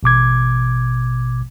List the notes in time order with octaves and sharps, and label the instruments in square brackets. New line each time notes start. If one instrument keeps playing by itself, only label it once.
[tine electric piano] A1 B2 D6 G#6